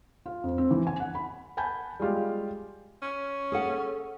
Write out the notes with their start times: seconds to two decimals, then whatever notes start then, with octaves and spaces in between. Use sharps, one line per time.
0.26 F4
0.43 F2
0.58 C4
0.71 E3
0.87 G#5
1.00 F#5
1.15 B5
1.57 F#5 G#5 A5 B5 G6
2.00 G3 G#3 F4 G4
3.02 C#4
3.52 G#4 A4 F#5